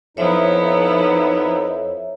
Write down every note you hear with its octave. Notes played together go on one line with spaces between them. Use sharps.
F2 F3 B3 D#4 E4 C#5 E5